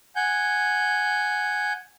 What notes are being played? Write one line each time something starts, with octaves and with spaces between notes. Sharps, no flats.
F#5 G#5 G6